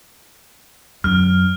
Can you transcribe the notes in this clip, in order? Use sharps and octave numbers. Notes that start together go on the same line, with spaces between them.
F#2 F6